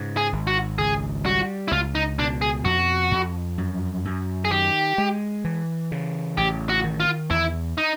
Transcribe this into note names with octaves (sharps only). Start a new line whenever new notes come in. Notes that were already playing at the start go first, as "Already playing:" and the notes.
Already playing: G#2 C#3
G#4
G#1
F#4
C#2 G#4
G3 F#4
E4
C#2 F4
D#4
B2 D4
G#4
F2 F#4
F2
F#2
F#2
G#4
D#3 G4
G#3
E3
C#3
A1 G4
F#4
D#3
F4
E2 E4
D#4